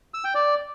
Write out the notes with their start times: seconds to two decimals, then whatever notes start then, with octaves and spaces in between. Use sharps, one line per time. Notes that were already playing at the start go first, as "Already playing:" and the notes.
0.14 E6
0.24 G5
0.35 D5